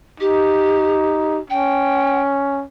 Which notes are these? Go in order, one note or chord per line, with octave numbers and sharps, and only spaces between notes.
D#4 G4
C#4 G5